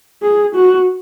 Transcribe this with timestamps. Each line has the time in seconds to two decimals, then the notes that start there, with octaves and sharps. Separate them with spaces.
0.22 G#4
0.55 F#4